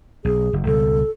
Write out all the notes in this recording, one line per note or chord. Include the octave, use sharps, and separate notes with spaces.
B1 G#4
F#1
C#2 B2 G3 A4